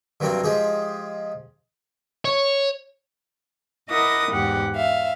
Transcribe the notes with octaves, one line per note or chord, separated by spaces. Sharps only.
G2 C3 F#3 A#3 C4 D4
F3 G#3 G4 G#4
C#5
E4 A#4 D#5 F#5 D6 D#6
E2 G#2 G4 F#5
E5 F5